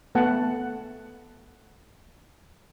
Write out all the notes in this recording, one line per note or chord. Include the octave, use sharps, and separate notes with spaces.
A3 B3 F#5 A5